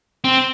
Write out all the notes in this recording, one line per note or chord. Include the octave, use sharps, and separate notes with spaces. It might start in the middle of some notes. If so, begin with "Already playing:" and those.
C4